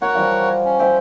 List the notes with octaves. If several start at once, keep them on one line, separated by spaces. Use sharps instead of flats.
F#4 A#4 C#5 F#5
F3 G3 F5
C#4
C5 E5 G5